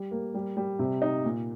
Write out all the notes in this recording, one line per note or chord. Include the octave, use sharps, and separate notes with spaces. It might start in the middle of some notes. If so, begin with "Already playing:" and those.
Already playing: G3
A#3
G3
G3
C3
D#4
A#2